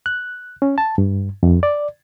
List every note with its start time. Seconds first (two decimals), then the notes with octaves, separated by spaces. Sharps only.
0.06 F#6
0.62 C#4
0.78 A5
0.98 G2
1.43 F2
1.63 D5